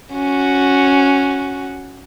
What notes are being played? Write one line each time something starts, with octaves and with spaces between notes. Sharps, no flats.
C#4 F#4